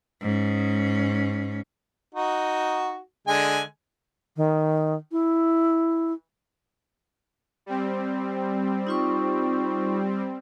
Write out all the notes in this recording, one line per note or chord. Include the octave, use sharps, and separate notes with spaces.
G#2 C#4
D#4 F#4
D3 G#3 G#5
D#3
E4
G3 C4
D#4 F4 C#6